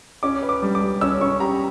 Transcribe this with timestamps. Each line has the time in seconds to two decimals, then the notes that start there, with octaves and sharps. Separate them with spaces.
0.23 C#4 D6
0.43 B4
0.49 D6
0.62 G3
0.75 D6
0.81 G3
1.01 C#4 E6
1.21 C#4 C#6
1.40 G4 A#5